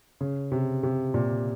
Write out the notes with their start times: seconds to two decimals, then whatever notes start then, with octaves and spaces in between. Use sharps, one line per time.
0.21 C#3
0.52 C3
0.83 C3
1.14 A#2